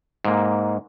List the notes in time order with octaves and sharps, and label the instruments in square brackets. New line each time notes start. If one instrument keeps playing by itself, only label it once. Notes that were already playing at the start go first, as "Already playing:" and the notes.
[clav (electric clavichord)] G#2 A#3